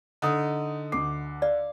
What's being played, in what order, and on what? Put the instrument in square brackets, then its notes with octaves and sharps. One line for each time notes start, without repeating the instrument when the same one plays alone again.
[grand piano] D3 [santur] D#4 D#6
[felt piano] D2 C7 [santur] D6
[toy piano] D5 [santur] F5